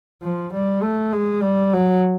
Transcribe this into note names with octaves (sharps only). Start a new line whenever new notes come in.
F3
G3
A3
G#3
G3
F#3